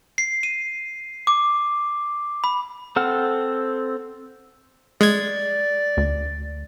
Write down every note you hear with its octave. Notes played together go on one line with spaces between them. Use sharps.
C7
D#7
D6
B5
C4 A4 F#5 F6
G#3 D5 G#6
D2